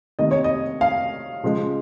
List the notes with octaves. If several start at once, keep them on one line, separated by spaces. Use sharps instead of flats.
C3 D#3 A#3 D#5
C#5
D#5
F5
C#3 F3 G#3